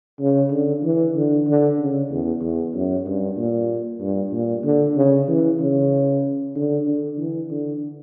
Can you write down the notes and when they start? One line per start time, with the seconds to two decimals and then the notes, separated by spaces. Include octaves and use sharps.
0.20 C#3
0.51 D3
0.84 E3
1.15 D3
1.47 D3
1.79 C#3
2.10 E2
2.42 E2
2.74 F#2
3.06 G2
3.37 A#2
4.00 G2
4.32 A#2
4.64 D3
4.96 C#3
5.28 E3
5.59 C#3
6.55 D3
6.87 D3
7.18 E3
7.50 D3